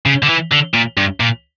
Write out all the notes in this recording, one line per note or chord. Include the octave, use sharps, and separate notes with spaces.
C#3
D3
E3
D3
A#2
G2
A#2